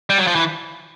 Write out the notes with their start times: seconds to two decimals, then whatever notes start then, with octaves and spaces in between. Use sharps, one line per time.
0.10 G3
0.18 F#3
0.27 F3
0.35 E3